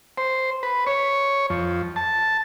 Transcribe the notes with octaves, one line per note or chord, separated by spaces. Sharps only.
C5
B4
C#5
F2
A5